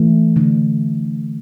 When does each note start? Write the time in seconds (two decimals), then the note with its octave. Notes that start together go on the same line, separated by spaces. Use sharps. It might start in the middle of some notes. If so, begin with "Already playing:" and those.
Already playing: E3 A3
0.36 D3 A3